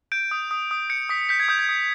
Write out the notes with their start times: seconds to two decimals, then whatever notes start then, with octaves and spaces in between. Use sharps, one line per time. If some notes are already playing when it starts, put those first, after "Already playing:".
0.12 G6 D7
0.31 D#6
0.51 D#6
0.71 D#6
0.90 G6 C#7
1.09 D#6 B6
1.29 G6 B6
1.40 G#6
1.48 D#6 G6
1.59 G#6
1.69 D#6